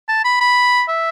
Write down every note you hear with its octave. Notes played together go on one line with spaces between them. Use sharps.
A5
B5
B5
E5